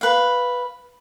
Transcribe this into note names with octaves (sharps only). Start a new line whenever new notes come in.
B4 F5